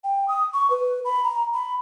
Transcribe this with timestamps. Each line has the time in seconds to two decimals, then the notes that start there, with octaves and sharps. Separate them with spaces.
0.04 G5
0.28 D#6
0.54 C#6
0.70 B4
1.05 B5
1.24 A#5
1.54 B5